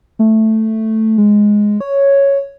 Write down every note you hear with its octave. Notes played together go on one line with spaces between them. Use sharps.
A3
G#3
C#5